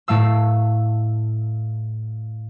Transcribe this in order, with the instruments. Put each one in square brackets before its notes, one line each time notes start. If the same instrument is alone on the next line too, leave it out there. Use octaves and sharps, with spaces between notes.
[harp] A2 A3 F5 E6